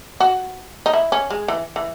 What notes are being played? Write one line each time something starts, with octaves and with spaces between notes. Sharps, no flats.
F#4
D#4
E4
C#4
G#3
E3
E3